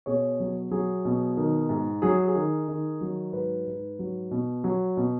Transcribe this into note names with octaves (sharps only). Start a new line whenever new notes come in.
B2 G#4 C#5
F#3
F#3 G#4
B2
D#3
G#2
F#3 G#4
G#4
D#3
D#3
F#3
G#2 B4
G#2
F#3
B2
F#3
B2